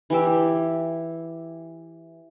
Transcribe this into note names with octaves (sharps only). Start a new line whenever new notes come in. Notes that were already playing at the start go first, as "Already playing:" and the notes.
E3 G4 E5